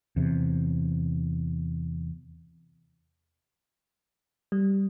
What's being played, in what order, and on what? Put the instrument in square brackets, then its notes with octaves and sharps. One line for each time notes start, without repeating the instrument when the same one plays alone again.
[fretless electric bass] E2 C3
[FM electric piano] G3